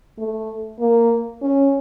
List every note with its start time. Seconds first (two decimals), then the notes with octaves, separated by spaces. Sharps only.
0.18 A3
0.80 A#3
1.42 C#4